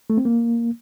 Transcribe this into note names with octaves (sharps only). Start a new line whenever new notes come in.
A3
C4
A#3